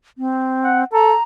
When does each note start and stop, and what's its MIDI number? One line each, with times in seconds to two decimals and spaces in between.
0.18 0.84 60
0.63 0.82 78
0.93 1.15 69
0.93 1.23 82